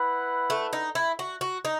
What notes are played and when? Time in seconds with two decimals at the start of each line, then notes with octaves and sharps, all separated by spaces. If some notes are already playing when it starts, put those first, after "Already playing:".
Already playing: E4 B4 F#5
0.50 A3
0.73 D#4
0.95 E4
1.19 F#4
1.41 F#4
1.65 D#4